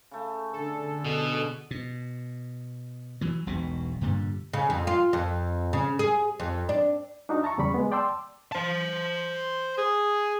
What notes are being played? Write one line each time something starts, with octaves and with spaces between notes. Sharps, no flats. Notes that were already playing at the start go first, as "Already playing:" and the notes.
C#3 A3
D3 A4
B2
B2
E3 F#3
E1 B1 B2
G2 A#2 D3 G3
C#3
F2
F4
F2
C#3
G#4
F2
D4
D4 D#4 F#4
E5 A5 A#5 C#6
E2 C#3 G3 D5 B5 C#6
G#3 B3
D5 G5 A5 C6 D6 E6
C5 A5
G#4